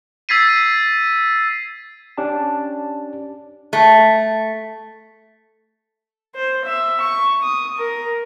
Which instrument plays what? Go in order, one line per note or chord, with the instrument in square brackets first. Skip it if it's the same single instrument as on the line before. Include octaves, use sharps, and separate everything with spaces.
[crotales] E6 G#6 A6 B6 C7 D#7
[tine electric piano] C#4 D4 G4 A5
[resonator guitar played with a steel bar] A3
[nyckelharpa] C5
E5
C#6
D#6
A#4